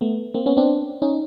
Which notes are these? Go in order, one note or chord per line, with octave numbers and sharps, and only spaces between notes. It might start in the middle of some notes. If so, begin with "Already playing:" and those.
A3 B3
A#3 C4
B3 C#4
C4 D4
C#4 D#4